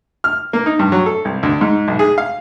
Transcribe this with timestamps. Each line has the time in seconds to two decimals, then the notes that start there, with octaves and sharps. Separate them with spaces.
0.24 F6
0.53 A#3
0.66 D#4
0.79 G2
0.92 F#3
1.06 A4
1.25 C2
1.43 D2
1.61 G#2
1.88 B1
1.99 G#4
2.18 F5